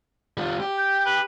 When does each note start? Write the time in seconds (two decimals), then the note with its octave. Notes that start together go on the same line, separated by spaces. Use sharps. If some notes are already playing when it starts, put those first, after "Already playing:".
0.37 G3 F4
0.60 G4
0.78 G5
1.06 B4